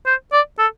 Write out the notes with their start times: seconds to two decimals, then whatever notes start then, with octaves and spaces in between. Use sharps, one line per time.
0.06 C5
0.32 D5
0.58 A4